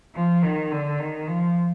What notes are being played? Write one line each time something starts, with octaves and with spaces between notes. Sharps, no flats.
F3
D#3
D3
D#3
F3